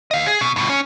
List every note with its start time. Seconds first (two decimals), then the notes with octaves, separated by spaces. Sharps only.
0.11 D#5 F5
0.26 G#4
0.41 B2
0.56 G2 B2
0.70 C#4